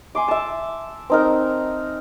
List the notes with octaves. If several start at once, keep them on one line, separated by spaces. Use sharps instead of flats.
G#5 C6 D6
E5 A5
C4 D#4 A#4